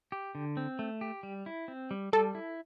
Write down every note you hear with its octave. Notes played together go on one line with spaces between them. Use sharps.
G4
D3
C4
A3
G4
G3
E4
C4
G3
G3 A4
E4